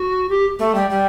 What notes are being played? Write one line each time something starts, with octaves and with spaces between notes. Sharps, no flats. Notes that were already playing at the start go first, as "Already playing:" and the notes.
Already playing: F#4
G4
A3
G3
G3